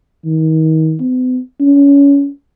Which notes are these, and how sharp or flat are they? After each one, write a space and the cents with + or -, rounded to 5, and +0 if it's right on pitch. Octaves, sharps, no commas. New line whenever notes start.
D#3 +35
B3 +45
C#4 +25